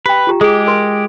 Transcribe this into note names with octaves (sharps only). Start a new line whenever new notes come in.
G4 B4 G5
F4 G4 A#5
G#3 G4 G#4 D#6
A#4 B4 C6